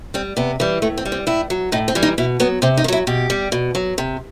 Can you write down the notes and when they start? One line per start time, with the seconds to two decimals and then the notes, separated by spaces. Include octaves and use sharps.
0.14 G3 C4
0.37 C3 B3
0.60 E3 G3
0.82 A2 A3
0.97 C4
1.05 G3
1.12 C4
1.27 A2 E4
1.50 F#3
1.72 A2 D#4
1.88 C4
1.95 E3 G3
2.03 D#4
2.18 B2 E4
2.40 F#3 B3
2.62 C3 C4
2.77 D#4
2.84 D#3
2.88 F#3 E4
3.07 B2 G4
3.30 G3
3.52 B2
3.75 F#3
3.98 C3